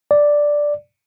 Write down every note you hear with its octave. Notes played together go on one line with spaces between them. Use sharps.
D5